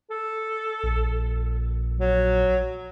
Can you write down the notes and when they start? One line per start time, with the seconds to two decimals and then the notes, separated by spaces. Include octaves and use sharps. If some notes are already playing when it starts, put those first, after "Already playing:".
0.10 A4
0.83 A#1
2.00 F#3